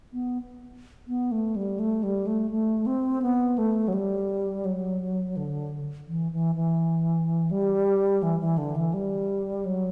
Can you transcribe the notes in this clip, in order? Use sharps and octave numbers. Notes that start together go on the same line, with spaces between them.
B3
B3
A3
G3
A3
G3
A3
A3
C4
B3
A3
F#3
G3
F#3
D3
E3
E3
E3
G3
E3
E3
D3
E3
G3
F#3